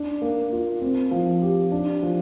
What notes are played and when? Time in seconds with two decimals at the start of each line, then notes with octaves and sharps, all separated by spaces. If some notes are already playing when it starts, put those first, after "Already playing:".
Already playing: D4
0.22 A#3
0.52 F4
0.82 C4
1.11 F3
1.42 G4
1.72 D4
2.03 F3